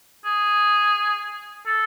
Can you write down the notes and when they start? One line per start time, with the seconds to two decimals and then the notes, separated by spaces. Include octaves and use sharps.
0.25 G#4
1.66 A4